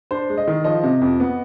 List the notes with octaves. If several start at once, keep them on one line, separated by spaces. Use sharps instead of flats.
D4 C5
G#3
D#5
D#3
F3 D#5
C3
F2
B3